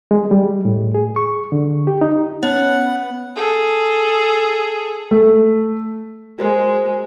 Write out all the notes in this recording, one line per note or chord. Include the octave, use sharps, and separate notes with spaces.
G#3
G3
A2
G#4
C#6
D3
G4
D#4
B3 C#4 C#5 F#5
G#4 A4
A3
G#3 F#4 A#4 C5